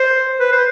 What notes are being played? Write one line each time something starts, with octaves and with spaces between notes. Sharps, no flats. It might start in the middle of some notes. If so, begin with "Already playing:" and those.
Already playing: C5
B4
C5